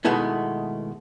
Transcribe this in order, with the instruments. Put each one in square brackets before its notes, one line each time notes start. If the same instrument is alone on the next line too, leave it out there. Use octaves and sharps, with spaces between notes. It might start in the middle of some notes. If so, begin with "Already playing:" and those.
[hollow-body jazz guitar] B2 D#3 G#3 A3 B3 E4